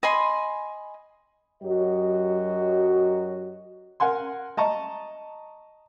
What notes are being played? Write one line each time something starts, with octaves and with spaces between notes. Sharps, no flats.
D#5 G#5 B5 C6
F#2 F#3 F#4 G4 D#5
A#4 F#5 G#5 C6
D#5 A5 A#5 C#6